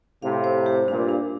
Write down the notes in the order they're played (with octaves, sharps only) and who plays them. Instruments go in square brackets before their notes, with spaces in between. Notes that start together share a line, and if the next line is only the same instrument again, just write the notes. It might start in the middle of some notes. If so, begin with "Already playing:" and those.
[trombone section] A2 C3 [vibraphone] F5
[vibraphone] C5
G4
[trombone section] G2 A#2 [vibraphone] D4
[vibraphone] D4